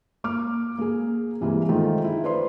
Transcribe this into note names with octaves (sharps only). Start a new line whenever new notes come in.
A#3 D6 F6
A#3 G#4
C3 E3 G3 G#3 A#3
D#3 F3 G#3 A3 F4
E4
B4 C5 D5 C6